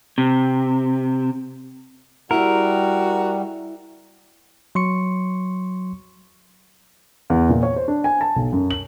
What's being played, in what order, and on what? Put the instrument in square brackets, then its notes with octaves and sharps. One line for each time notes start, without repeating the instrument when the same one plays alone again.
[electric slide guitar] C3
[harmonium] G3 [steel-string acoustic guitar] E4 G#4 [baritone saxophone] F#4 [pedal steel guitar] A#4
[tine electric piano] F#3 C6 C#6 C#7
[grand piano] E2
A#2
C#5
C5
D4
G#5
A5
B1
F#2
F#7